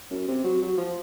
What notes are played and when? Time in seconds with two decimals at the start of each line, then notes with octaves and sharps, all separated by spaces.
0.10 F#2
0.28 C3
0.44 F#3
0.62 F#3
0.78 F3